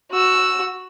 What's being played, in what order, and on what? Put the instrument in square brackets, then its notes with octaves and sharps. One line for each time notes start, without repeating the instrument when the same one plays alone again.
[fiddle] F#4 E6